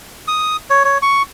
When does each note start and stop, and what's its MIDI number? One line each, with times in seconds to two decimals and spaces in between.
0.28 0.57 87
0.70 0.83 73
0.85 0.98 73
1.02 1.22 85